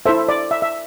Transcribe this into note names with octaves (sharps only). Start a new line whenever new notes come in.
E4 A4 C5 E5
D5
E5
E5